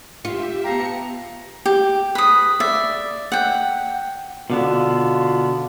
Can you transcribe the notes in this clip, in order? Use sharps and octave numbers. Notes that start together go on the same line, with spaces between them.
F4 G4 E5
B3 G4 F5 A5 A#5 C#7
G4
B4 D#6
D5 E5
F#5 G5
B2 D3 B3 F4